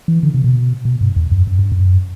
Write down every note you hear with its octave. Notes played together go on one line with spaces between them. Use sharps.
E3
D3
C3
B2
B2
G2
E2
F#2
F#2
G2
F#2